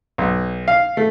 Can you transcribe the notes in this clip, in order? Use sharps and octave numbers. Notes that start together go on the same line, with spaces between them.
B1
F5
A3